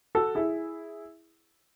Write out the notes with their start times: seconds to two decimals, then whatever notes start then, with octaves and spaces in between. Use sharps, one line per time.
0.15 F#4 A4
0.35 E4 G#4